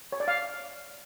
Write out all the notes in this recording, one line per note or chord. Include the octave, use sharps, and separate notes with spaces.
C#5
D5
F5